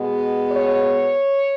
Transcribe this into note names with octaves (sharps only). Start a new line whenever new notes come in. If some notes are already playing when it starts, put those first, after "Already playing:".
Already playing: B2 G#3 B3
C#5